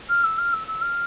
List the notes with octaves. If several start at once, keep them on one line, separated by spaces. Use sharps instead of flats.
F6
E6
F6
E6
E6
F6